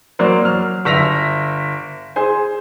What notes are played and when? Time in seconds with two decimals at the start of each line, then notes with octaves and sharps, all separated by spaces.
0.19 F#3 A#3 C5 D5
0.44 F#3 F6
0.85 G1 E5 A#6 B6 F7
2.16 G#4 C5 G#5